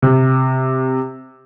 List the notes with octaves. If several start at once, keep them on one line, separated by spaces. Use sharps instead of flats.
C3